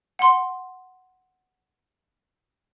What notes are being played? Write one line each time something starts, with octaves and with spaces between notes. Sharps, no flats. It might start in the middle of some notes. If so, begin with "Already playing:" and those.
F#5 C6